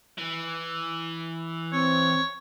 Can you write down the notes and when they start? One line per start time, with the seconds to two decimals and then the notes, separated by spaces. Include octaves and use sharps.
0.18 E3
1.72 C4 C#5